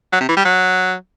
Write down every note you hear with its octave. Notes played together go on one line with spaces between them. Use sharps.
F#3
C3
E3
G3
F#3